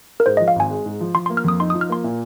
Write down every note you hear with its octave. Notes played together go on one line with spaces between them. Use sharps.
A#4
G#2 C5
F3 D#5
F5
G#1 G#5
G#3
G#2
F3
F3 C6
A#3 C6
F6
F2 D#6
D#4 C6
F3 D#6
F6
A#3 C6
A#2